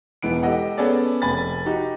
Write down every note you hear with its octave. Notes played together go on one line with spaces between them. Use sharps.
E1 E3 B3 D7
G4 A4 D#5 F#5
B3 C#4 G#4 A4 D5
F1 G#5 B5 A6
D#4 F#4 G4